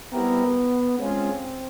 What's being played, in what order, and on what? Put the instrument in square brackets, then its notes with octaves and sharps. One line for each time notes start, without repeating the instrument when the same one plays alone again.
[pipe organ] G3 C4 E4 G4 A#4 [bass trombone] B3
[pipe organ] G#3 C#4 F4 G#4 [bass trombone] C4